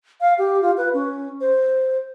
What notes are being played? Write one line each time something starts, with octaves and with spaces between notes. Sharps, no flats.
F5
G4
F4
B4
C#4
C5